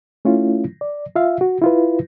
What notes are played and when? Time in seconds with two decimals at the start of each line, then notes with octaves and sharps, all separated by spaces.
0.25 A3 C#4 E4 F4
0.81 D5
1.16 F4 E5 F5
1.41 F#4
1.62 E4 F4 B4